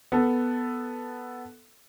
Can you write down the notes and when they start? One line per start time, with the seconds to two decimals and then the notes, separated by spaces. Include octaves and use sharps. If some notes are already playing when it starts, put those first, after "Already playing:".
0.12 B3 A4